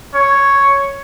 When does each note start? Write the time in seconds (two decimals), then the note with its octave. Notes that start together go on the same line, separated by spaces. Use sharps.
0.14 C#5